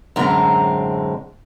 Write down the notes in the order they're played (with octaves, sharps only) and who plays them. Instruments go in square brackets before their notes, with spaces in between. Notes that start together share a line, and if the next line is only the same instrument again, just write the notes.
[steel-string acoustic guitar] F#2 A2 D3 G#3 C4 A#5